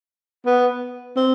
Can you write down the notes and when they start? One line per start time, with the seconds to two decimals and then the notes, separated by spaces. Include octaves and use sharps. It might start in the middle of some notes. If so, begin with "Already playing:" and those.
0.46 B3
1.16 C4